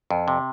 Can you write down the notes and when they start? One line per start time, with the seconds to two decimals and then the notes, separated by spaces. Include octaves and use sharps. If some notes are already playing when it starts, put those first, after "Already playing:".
0.11 F2
0.28 C3